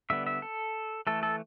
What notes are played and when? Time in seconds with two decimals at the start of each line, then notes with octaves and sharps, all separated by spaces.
0.10 D3 G3 B3 E5
0.27 E5
0.42 A4
1.07 E3 A3 A4
1.23 A4